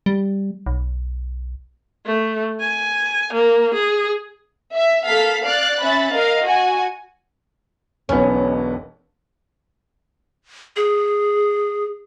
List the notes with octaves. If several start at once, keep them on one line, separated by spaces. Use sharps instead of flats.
G3
B1
A3
G#5
A#3
G#4
E5
A#3 A4 F5 B6
D5 F5 F#6 A6
C#4 E5 B5 F#6 A6
A#4 D#5 F5
F#4 G#5
E1 B1 B3 C#4
G#4